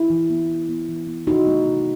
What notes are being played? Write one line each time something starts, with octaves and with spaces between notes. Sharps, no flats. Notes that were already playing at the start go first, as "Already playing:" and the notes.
Already playing: E4
E3
B3
E3
B3
E3
B3
C3 D#4 F#4
F#3 A3
C3